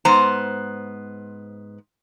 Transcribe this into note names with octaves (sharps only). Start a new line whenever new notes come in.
G#2 B3 C5 A#5